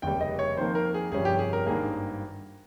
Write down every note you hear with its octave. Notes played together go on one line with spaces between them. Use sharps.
F1 D#2 C#3 G3 G5
D#5
C#5
F2 D#3 A#3 C5
A#4
G#4
G1 F2 C3 G3 C#4 G#4
G4
G#4
A#4
G#1 G2 D#3 A#3 G#4